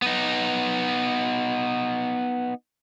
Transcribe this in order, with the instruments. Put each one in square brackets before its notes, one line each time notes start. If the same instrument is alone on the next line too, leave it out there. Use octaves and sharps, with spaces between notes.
[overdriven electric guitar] B3 D#4